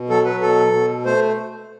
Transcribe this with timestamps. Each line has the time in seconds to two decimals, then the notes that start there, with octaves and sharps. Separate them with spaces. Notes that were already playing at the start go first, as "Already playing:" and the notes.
Already playing: B2
0.10 F#3 A4
0.25 B4
0.41 B2 A4
0.73 B2
1.05 A3 C5